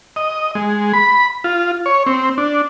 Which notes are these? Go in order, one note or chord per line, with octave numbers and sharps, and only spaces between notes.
D#5
G#3
B5
F4
C#5
C4
D4